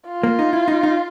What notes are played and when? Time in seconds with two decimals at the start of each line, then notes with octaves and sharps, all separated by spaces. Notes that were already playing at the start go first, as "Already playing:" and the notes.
0.09 F4
0.23 A#3
0.39 D#4
0.53 E4
0.68 D#4
0.83 D#4